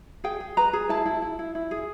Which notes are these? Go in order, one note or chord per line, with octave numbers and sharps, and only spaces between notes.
G#4 G5
G#4
B4 A#5
G#4
E4 A5
E4
E4
E4
E4
G#4